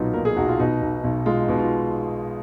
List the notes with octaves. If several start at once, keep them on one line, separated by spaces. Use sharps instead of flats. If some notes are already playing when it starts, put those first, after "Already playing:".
Already playing: B1 A#2 F#3 B3 D#4 F4
A#2 A#4
G#4
B1 F#4
F4
B2 D#4
B1
B1
G#3 F4
D#4
B2
F4